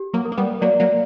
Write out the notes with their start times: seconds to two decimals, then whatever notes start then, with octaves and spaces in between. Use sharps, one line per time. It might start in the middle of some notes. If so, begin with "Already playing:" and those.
Already playing: G4
0.14 F#3 A#3
0.25 A#4
0.32 A#3
0.37 G3 B3
0.61 F#3 A#3 D5
0.80 F#3 A#3